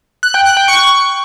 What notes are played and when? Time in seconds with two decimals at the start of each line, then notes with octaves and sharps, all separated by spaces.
0.23 F#6
0.34 G5
0.45 F#6
0.57 G5
0.68 C#6